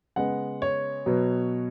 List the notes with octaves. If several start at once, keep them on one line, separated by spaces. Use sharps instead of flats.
C#3 G#3 B3 F#5
C#5
B2 F#3 B3